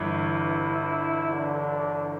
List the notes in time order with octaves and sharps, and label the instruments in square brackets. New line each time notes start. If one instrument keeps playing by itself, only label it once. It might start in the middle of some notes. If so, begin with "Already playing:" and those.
Already playing: [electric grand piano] G1 G2 E3 [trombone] E4
[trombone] D3